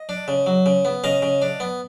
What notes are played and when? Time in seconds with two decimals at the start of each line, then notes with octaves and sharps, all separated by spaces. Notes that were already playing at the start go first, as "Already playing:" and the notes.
Already playing: D#5
0.09 D4
0.28 C#3
0.46 F#3
0.66 C#3
0.85 B3
1.04 C#3 D#5 F5
1.22 C#3
1.42 D4
1.60 B3